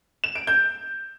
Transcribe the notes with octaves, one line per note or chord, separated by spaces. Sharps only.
E7
D7
G6